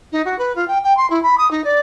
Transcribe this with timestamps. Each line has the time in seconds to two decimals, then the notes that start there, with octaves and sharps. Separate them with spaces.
0.12 D#4
0.25 F#4
0.38 B4
0.55 F4
0.67 G5
0.83 G5
0.96 C6
1.09 E4
1.22 B5
1.37 D#6
1.50 D#4
1.64 D5